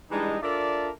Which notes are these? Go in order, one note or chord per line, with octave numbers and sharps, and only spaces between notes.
E3 G3 G#3 D4 D#4
D4 F4 A4 A#4 D5 E5